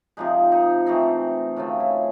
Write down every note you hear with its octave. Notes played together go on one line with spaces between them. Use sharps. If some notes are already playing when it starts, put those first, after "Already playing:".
C3 F3 G#3 D#4
D#4
E3 A3 C4 D#4
C#3 F#3 A3 C4 F4
E4